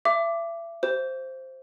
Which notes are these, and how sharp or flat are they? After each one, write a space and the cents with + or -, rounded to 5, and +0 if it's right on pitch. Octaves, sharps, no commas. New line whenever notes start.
E5 +35 D6 +0
G4 -45 C5 +0